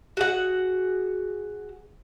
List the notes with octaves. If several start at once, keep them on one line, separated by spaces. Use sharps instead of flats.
F#4 G#4 F#5